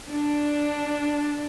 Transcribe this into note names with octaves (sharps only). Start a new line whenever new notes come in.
D4